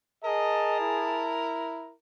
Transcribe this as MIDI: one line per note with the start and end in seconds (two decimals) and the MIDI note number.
0.24 1.33 68
0.24 1.94 70
0.24 0.76 75
0.24 1.52 81
0.80 1.93 64